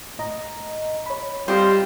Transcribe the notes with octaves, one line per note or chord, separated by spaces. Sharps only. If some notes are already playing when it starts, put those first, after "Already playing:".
A2 D#5 A#5
C#5 B5
G3 C4 F4 C5 D#5